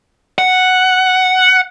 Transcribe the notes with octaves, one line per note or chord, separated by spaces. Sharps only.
F#5